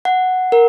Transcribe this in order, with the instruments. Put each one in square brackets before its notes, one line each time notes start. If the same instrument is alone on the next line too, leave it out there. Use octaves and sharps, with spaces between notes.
[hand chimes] F#5
A#4